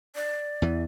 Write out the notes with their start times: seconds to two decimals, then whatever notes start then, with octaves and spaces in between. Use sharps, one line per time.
0.15 D5
0.62 E2 E3